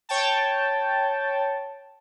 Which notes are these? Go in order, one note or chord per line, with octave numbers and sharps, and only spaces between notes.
C#5 G5 A5